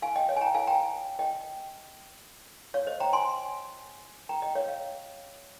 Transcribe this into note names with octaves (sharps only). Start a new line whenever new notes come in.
F5 G#5
D#5 G5
C#5 F5
G#5
G5 A#5
F5 G#5
G5 A#5
D#5 G5
C#5 F5
C5 D#5
G5 A#5
G#5 C6
G5 A#5
D#5 G5
C#5 F5
C#5 F5